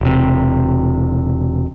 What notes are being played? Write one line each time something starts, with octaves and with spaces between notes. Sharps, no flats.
E1 C3